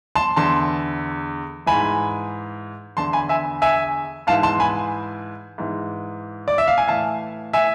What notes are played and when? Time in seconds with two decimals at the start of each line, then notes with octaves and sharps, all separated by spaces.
0.16 A5 C6
0.36 E2 D3 A5 C6
1.66 G#2 E3 G#5 B5
2.97 E2 D3 A5 C6
3.13 G#5 B5
3.29 E5 G#5
3.62 E5 G#5
4.27 G#2 E3 F5 A5
4.43 A5 C6
4.60 G#5 B5
5.58 G#2 E3
6.48 D5
6.58 E5
6.67 F5
6.78 G#5
6.88 A2 E3 F5 A5
7.53 E5 G#5